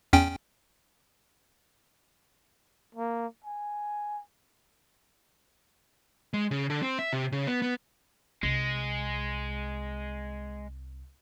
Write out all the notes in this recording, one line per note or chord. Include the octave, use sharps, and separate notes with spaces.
E2 C#4 G5
A#3
G#5
G#3
C#3
D3
C4
E5
C3
C#3
B3
B3
C2 G#3